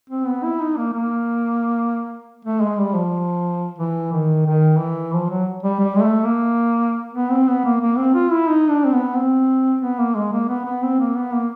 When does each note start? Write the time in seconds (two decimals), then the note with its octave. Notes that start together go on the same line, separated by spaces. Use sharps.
0.10 C4
0.27 B3
0.44 E4
0.61 D#4
0.77 A#3
0.94 A#3
2.45 A3
2.62 G#3
2.79 G3
2.95 F3
3.79 E3
4.12 D#3
4.47 D#3
4.80 E3
5.13 F3
5.30 F#3
5.63 G3
5.80 G3
5.95 G#3
6.02 A3
6.25 A#3
7.14 B3
7.31 C4
7.48 B3
7.65 A#3
7.81 A#3
7.98 C4
8.15 F4
8.32 E4
8.48 D#4
8.70 D4
8.85 C4
8.93 B3
9.15 C4
9.82 B3
9.99 A#3
10.15 G#3
10.33 A#3
10.49 B3
10.66 B3
10.83 C4
11.00 A#3
11.16 B3
11.33 A#3